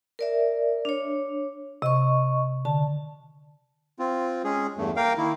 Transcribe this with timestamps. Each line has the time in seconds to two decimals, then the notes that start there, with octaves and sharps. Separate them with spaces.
0.19 A#4 D5 E5
0.85 D4 C#5
1.82 C3 D#5 C#6
2.65 D3 A5
3.99 C4 F4
4.44 G#3 C#4 G#4
4.77 E2 G2 A3
4.96 A#3 A#4 F5 G5
5.17 D#3 A#3 E4